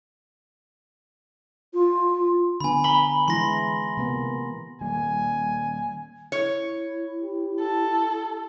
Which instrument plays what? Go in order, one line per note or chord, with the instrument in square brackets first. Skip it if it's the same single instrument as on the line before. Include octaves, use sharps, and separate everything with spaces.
[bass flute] F4
[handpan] D3 B3 [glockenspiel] G#5 B5
[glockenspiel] A#5 F#7 G7 [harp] B5
[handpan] E3 G#3 E4 [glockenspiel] C6 A#6
[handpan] C3 A#3 B3
[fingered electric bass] D#3 G3 A#3 [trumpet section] G#5
[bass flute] E4 [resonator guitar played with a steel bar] C#5
[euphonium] G4
[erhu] A4